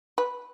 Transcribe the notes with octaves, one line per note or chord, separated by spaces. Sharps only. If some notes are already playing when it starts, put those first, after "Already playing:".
B4